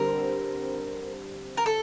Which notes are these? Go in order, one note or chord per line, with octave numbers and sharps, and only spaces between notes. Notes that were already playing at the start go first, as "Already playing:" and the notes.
Already playing: D3 G3 C4 A#4
A#4
A4